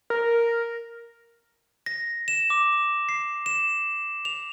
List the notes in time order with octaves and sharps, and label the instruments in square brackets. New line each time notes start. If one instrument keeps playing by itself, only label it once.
[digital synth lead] A#4
[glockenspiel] A#6
E7
D6
C7
E7
F7